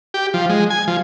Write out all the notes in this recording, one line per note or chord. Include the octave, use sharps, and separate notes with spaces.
G4
F3
G#3
G#5
F3